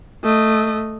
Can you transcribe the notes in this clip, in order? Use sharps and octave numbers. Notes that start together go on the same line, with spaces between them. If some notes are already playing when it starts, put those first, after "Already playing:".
A3 D#5